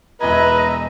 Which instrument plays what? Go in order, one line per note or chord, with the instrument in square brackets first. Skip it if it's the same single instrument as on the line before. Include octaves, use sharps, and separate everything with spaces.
[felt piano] E1 E2 G#6 [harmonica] B4 [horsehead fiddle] D#5 E5 [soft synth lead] A#5